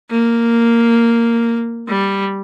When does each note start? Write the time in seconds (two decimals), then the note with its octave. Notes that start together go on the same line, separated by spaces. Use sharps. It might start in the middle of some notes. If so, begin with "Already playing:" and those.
0.10 A#3
1.88 G3